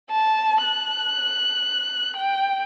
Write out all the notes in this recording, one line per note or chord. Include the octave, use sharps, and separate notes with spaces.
A5
F#6
G5